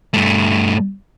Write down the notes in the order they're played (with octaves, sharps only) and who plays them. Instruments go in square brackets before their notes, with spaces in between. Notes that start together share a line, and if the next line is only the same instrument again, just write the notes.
[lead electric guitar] G2 A3